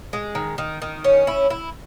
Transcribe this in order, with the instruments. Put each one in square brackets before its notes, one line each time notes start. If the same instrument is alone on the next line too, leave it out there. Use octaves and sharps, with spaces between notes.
[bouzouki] G#3
D#3
D#3
D#3
C#4
E4
E4